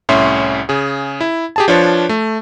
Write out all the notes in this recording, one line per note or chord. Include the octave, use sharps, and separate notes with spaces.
C2 A2 C#4 E5 C6
C#3 G#4
E4
G4 G#4 A5
F3 D4 F4 B4 C#5
A3